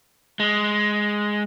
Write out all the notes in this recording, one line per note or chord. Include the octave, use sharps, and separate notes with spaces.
G#3